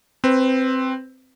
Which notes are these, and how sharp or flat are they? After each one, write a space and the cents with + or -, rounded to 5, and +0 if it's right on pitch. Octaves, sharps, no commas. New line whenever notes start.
C4 +0 B4 +15